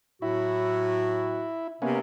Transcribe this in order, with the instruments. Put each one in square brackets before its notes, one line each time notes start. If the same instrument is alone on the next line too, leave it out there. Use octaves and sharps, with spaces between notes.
[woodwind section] A2 F#3 F#4 [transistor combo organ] E4
[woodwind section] C3 [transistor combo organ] A#3 B3 C#4